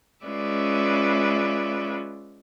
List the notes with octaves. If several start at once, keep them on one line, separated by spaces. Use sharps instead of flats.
G#3 C#4 F4 B4 D5 E5